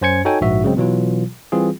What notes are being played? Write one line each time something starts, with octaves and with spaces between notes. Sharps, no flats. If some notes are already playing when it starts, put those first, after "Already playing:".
F#2 C#4 C5 G#5 G#6 C#7
D#4 F#4 A4 C#5 G5 G#5
A#1 G#2 F#4 E5
C#3 F#3 G#3 C4
B2 E3 F#3 F4
E3 G3 C4 F4 G#4